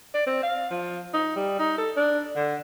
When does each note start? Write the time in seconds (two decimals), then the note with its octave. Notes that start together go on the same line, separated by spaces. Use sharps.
0.14 D5
0.26 C4
0.43 F5
0.70 F3
1.14 D#4
1.36 G3
1.59 D#4
1.78 A4
1.96 D4
2.36 D3